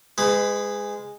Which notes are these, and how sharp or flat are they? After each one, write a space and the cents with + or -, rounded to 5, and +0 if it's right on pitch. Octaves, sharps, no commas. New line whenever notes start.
G#3 -10 B4 +35 B5 +0